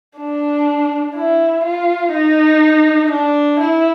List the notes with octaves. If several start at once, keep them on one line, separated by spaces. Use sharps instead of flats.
D4
E4
F4
D#4
D4
E4